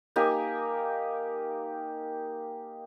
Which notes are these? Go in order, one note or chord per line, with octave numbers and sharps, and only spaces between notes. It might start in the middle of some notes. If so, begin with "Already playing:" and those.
A#3 D#4 G4 G#5